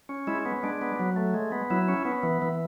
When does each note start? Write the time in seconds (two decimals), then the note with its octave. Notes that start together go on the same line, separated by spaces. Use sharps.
0.09 C#4
0.27 G#3 E4
0.45 B3
0.63 G#3 D4
0.81 B3
0.99 F#3
1.16 A3
1.34 G#3
1.52 B3
1.70 F#3 E4
1.88 C#4
2.05 B3
2.23 E3
2.42 E3